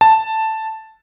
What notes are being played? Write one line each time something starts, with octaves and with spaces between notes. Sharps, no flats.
A5